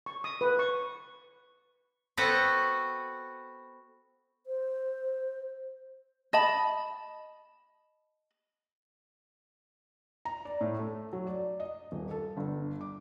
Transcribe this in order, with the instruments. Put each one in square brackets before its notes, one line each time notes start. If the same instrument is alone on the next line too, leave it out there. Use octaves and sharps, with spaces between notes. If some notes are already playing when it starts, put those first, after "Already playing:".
[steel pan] C#6
D#6
B4
C#6
[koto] B3 C4 F#4 A4 B4 F#5
[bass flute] C5
[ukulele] D#5 A5 B5
[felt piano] A#5
D5
A2
A3
F#3
D5
D#5
D#1
A4
G1
D6